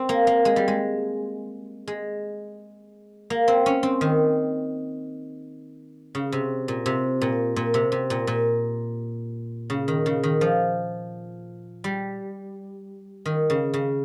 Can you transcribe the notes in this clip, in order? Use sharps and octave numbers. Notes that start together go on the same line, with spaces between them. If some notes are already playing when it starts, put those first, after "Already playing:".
Already playing: C4
A#3
A#3
G#3
G3
G#3
G#3
A#3
C4
C#4
C4
D#3
C#3
C3
A#2
C3
A#2
A#2
C3
C3
A#2
A#2
C#3
D#3
C#3
D#3
F3
G3
D#3
C#3
C#3